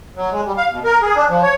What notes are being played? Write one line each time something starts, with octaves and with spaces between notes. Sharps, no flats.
F#3
G#3
G3
F5
B2
A#4
G#4
D4
F3
C#5